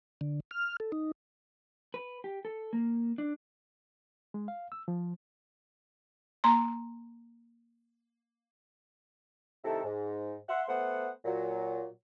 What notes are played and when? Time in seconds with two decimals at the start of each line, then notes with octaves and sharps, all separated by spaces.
0.21 D3
0.51 F6
0.80 A4
0.92 D#4
1.94 B4
2.24 G4
2.45 A4
2.73 A#3
3.18 D4
4.34 G#3
4.48 F5
4.72 E6
4.88 F3
6.44 A#3 A#5 C6
9.65 C3 D#3 A3 E4 A4
9.84 G#2
10.49 E5 F#5 C6
10.69 A3 B3 C5 F#5
11.25 A#2 F#3